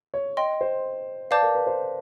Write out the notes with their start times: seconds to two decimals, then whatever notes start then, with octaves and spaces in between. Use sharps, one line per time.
0.14 C#5
0.37 D#5 G5 C6
0.61 C5
1.31 B4 D5 F5 A5 D6 G6
1.43 A#4
1.55 B4
1.67 C5